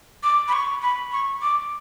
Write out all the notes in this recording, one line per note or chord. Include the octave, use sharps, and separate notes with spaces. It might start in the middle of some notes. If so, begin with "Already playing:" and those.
D6
B5
C#6
B5
C#6
D6